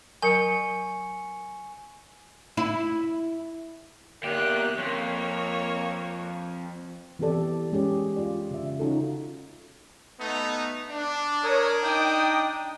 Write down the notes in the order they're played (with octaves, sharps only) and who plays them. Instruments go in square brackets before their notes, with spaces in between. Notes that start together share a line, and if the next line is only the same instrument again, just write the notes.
[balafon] F#3 A#4 A#5 [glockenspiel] G#5 [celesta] C#6 C#7
[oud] E4
[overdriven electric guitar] E2 G4 [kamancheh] A#3 F#6
[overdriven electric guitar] F2 [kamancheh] A#3 C#5
[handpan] E3 B3 C4 G4 A4 D5
G#3 C#4 G4 G#4
F4 D5
C#3 E5
C#4 D#4 F4 F#4 A4
[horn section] A3 B3 D#4
D4
[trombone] A#4 [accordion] C#5 D#6
[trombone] D#4 [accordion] G5 D#6